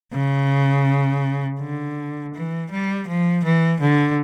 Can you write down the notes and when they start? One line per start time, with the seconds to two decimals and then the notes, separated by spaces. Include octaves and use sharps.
0.14 C#3
1.60 D3
2.34 E3
2.71 G3
3.08 F3
3.44 E3
3.81 D3